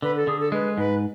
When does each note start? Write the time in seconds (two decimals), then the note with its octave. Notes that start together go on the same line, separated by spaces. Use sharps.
0.02 D3 B4
0.16 A4
0.27 D3 G#4
0.40 A4
0.52 G#3 B4
0.77 G#2 B4